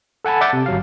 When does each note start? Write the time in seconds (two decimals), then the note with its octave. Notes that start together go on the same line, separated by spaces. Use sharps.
0.25 A4 F#5 G#5 A5 B5
0.41 D5 E5 F#5 D6 G6 A6
0.53 C3
0.66 G1 F#3 F5